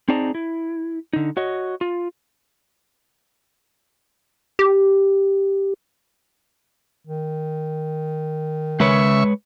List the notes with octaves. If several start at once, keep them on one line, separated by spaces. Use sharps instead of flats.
C4 D#4 G#4 D5 A5 A#5
E4
D3 D#4
F#4 C#5 D#5
F4
G4
D#3
C#3 G#3 B4 C#5 E5 C#6